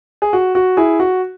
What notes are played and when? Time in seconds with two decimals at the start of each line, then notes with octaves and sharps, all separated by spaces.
0.22 G#4
0.33 F#4
0.55 F#4
0.77 E4 G#4
1.00 F#4